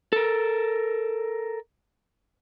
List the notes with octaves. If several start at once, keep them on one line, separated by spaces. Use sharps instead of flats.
A4 A#4